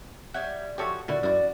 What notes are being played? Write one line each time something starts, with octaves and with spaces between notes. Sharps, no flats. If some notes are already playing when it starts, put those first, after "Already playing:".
G3 C#5 E5 F#5
F3 F#4 G4 A4 C#5 E5
A#2 D3 E4 F#4 D5
F#2 E4 F#4